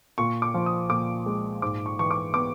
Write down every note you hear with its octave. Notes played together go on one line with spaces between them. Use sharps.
A#2 C#6
D6
F3
D#6
A#2 D6
G#3
G#2 D6
C#6
E3 C#6
D6
B3 D6